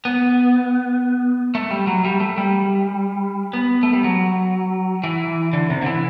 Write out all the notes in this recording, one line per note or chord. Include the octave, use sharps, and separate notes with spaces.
B3
A3
G3
F#3
G3
A3
G3
B3
A3
G3
F#3
E3
D3
C3
D3
E3